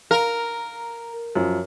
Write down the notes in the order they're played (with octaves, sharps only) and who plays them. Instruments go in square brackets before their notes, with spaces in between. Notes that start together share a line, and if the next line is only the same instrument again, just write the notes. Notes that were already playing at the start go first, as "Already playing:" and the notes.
[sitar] A#4 [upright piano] F5 A#5
[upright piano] F#2 F3